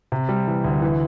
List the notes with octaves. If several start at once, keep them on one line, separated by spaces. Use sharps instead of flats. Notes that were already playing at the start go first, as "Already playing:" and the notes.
C3
G3
E3
D2
E3